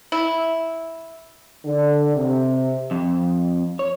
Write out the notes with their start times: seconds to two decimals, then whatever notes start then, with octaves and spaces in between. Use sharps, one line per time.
0.12 E4
1.65 D3
2.16 C3
2.91 F2
3.79 C#5